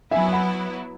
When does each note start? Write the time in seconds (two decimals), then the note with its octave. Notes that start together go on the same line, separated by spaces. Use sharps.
0.11 F#3 B3 E4 E5 G#5
0.26 G#5
0.33 F#5 B5